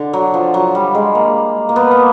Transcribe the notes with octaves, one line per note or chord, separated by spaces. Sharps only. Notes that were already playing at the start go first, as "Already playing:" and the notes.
Already playing: D3
F#3
F3
F#3
G3
G#3
A#3
A#3
B3
A#3